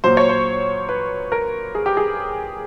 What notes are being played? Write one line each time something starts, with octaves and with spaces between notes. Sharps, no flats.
A#2 F#3 C5
C#5
C5
B4
A#4
G#4
G4
G#4